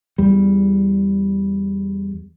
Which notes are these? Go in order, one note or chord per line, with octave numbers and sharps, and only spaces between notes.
E2 G3